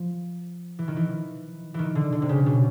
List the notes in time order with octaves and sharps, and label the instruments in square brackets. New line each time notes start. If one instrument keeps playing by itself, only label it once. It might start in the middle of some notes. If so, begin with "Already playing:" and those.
Already playing: [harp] F3
E3
D#3
E3
D#3 E3
D3
D3
C3
C#3
B2